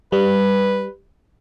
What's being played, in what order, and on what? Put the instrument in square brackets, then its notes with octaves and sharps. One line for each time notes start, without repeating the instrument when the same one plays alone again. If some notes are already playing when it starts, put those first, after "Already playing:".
[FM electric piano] G3 [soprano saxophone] B4